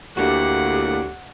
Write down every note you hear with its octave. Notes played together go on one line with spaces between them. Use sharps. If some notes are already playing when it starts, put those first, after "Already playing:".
D2 A2 A#3 F#4 G4 F#5